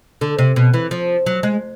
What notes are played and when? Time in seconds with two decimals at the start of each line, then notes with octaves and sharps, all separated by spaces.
0.21 D3
0.39 C3
0.56 B2
0.74 E3
0.91 F3
1.26 F#3
1.43 G#3